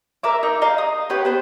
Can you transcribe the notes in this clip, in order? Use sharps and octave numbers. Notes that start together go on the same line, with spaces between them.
A#4 E5 D6
D#4
D#5 F5 A#5
D#6
G4 B4 C#5
B3 C5